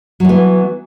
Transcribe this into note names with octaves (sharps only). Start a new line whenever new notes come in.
E3 F#3 B3